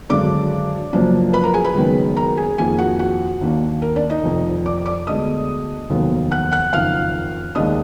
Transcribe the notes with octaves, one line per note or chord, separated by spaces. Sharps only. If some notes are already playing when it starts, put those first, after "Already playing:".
G#1 F#2 D3 G#3 D4 D5 D6
F#1 F#2 F3 A#3 D4
B4 B5
A#4 A#5
G#4 G#5
B4 B5
F#1 F#2 D#3 G#3 B3
A#4 A#5
G#4 G#5
F2 D#3 A#3 G#4 G#5
F#4 F#5
F#4 F#5
D#2 D#3 A#3 D4
A#4
D4 D5
D#4 D#5
F1 F2 D#3
D5 D6
D5 D6
D2 D3 G#3 B3 D#5 D#6
F1 D#2 D#3 F#3 B3
F#5 F#6
F#5 F#6
F#1 F2 D#3 F5 F6
D#2 D#3 G#3 D4 D#5 D#6